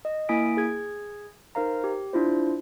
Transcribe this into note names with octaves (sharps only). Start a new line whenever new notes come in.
D#5
A#3 E4 G#5 D#6 B6 D7
G#4 G#6
D#4 A#4 C5 F5 A#5
G4
D4 E4 F4 C5